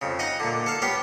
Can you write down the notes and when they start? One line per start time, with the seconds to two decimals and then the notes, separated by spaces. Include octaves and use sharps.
0.02 F2 C#3
0.19 D#4 D#5 F#5
0.40 A#2 D3
0.66 A4 F5
0.82 B3 G4 C#5 F5